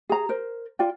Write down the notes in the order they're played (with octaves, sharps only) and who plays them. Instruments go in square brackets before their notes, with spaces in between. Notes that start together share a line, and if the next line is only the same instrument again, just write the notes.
[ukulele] G#4 A#5
A#4 C5
F4 D5 G5